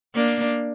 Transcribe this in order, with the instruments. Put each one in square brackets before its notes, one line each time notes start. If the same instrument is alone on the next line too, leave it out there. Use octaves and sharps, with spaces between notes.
[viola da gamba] A#3 D4